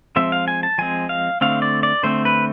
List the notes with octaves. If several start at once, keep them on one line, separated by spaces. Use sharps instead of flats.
F3 G#3 C4 E5
F5
G#5
A5
F3 G#3 C4 G#5
F5
D3 A3 C4 F5
D5
D5
D3 A3 C4 C5
B4